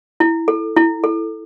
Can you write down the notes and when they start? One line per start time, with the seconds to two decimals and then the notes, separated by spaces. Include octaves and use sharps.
0.20 E4
0.48 A4
0.76 E4
1.04 A4